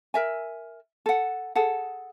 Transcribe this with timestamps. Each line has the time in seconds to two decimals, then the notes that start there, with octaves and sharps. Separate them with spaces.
0.14 A#4 E5 G#5
1.06 A4 F#5
1.55 G#4 A4 F#5